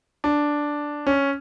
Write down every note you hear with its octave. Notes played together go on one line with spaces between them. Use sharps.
D4
C#4